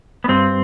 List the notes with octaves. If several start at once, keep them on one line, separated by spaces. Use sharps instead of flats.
B3
G2 C4